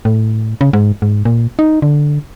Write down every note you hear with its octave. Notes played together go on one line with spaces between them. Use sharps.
A2
C#3
G#2
G#2
A#2
D#4
D3